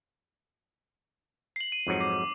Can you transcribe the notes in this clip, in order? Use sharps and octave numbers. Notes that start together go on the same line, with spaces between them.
C7 F#7
D#7
F2 G#2 F#3
D6 C7